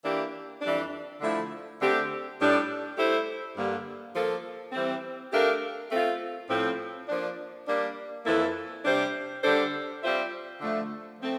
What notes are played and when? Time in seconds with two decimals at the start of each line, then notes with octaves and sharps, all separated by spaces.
0.02 E3 A#3 D4 G4
0.61 F2 E3 G3 D4
1.20 D3 F3 A3 E4
1.79 D3 A3 C4 G4
2.38 A2 G3 D4
2.96 A3 E4 G4 C5
3.55 G2 D3 G3 A#3
4.13 F3 A#3 F4 A4
4.72 E3 G3 C4
5.31 A3 D4 G4 A#4 F5
5.90 A3 C4 F4
6.49 A2 F3 C4
7.08 F3 A#3 D4
7.66 G3 A#3 D4
8.25 F2 E3 A#3 E4 A4
8.84 C3 G3 D4 G4 C5
9.42 D3 G3 D4 A4 C5
10.01 G3 C4 F4 C5 E5
10.60 D3 F3 A3
11.18 F3 A3 C4